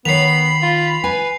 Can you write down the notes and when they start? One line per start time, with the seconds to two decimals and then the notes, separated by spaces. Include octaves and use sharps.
0.05 D#3 B3 C#5 B5 C7 F7
0.62 F4
1.04 B4 G#5